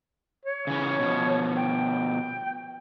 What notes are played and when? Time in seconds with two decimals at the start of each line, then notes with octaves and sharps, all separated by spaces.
0.45 C#5
0.67 C#3 E3 C#4
0.99 B2 F3
1.57 G5